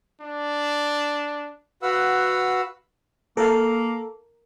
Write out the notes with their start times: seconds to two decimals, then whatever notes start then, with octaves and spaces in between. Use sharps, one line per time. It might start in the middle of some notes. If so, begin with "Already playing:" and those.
0.22 D4
1.82 F#4 B4 F5 F#5 E6
3.37 A#3 A4 A#4 F5